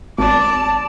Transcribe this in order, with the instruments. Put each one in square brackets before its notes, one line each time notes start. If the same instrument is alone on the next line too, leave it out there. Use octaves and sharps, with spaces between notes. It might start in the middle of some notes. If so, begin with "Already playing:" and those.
[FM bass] G#1 [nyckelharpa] D5 [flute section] A5